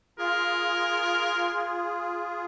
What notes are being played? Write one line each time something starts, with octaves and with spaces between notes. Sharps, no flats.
F4 G#4 A#4